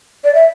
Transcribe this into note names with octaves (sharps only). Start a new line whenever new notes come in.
D5
E5